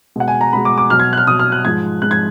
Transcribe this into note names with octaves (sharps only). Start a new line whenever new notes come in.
B2 G#3 F#5
G#5
A#5
B2 G#3 B5
D6
D6
B2 F#3 F6
G#6
F#6
F6
B2 F#3 D#6
F6
F#6
G#2 F3 G#3 G#6
G#2 F3 G#3 F#6
G#6